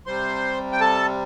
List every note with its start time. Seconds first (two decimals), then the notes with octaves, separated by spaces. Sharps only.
0.06 C3 G3 C5 C6
0.72 G5
0.80 A4 A5